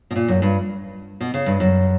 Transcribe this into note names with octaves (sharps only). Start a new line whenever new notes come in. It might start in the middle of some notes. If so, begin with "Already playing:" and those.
B2
A#2
F#2
G2
B2
C#3
G2
F#2